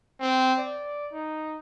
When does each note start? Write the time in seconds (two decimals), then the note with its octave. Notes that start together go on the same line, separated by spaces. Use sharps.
0.21 C4
0.59 D5
1.12 D#4